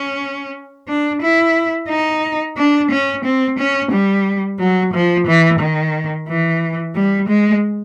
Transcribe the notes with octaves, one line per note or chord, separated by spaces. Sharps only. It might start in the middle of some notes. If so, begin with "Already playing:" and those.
Already playing: C#4
D4
E4
D#4
D4
C#4
C4
C#4
G3
F#3
F3
E3
D#3
E3
G3
G#3